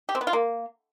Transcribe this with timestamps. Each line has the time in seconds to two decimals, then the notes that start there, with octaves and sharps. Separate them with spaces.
0.09 G4
0.15 C4
0.21 B3
0.27 F4
0.33 A#3